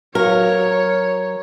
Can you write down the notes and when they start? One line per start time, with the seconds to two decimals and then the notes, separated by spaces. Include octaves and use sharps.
0.15 F#3 F#4 A#4 C#5 F5